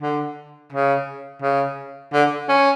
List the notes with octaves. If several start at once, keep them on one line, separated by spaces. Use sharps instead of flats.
D3
C#3
C#3
D3
C#4